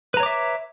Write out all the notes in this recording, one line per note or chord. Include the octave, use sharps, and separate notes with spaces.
B4 C#5 E5 A#5 D6